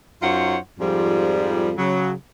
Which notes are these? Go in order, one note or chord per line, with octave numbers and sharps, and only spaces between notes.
F#2 D#4 F4 C5 C#5 F#5
F2 G#2 F3 G3
C#3 F#3